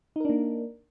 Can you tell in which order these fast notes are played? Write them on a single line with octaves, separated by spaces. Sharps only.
D#4 A#4 D4 A#3